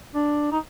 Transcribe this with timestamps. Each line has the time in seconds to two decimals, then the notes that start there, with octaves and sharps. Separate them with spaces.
0.15 D4
0.52 D#4